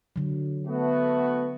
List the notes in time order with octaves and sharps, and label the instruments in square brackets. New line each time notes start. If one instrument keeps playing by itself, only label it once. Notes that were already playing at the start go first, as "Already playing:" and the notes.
[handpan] D3 F#3
[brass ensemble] A3 B3 F#4